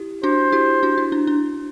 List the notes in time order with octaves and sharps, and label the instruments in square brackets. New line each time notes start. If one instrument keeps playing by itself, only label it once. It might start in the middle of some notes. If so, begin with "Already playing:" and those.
Already playing: [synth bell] E4 G4
[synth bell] D4 F#4 [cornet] C5
[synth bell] E4 G4
D4 F#4
E4
D4
D4